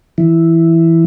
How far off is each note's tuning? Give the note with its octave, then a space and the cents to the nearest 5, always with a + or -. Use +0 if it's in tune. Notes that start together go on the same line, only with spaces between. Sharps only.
E3 +0 E4 +0